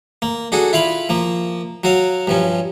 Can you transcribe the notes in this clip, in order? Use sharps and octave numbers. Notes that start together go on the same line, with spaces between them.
A#3
D4 F#4 G#4 A4
E4 F4 F5 B5
F3 A#3
F#3 F#4 F5
G2 F3 C#4